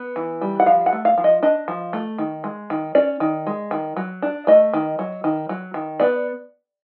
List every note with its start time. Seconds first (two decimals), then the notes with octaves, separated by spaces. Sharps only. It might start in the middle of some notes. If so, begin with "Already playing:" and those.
Already playing: B3
0.16 E3
0.41 G3
0.60 F#5
0.66 F3 F5
0.86 F#5
0.93 A3
1.05 F5
1.18 F3
1.24 D#5
1.43 D4 D#5
1.68 F3
1.93 A3
2.18 D#3
2.44 G#3
2.70 D#3
2.95 C#4 D5
3.20 D#3
3.47 G#3
3.71 D#3
3.96 F#3
4.22 D4
4.47 A3 D#5
4.73 D#3
4.99 F#3
5.24 D#3
5.49 F#3
5.74 D#3
6.00 B3 D5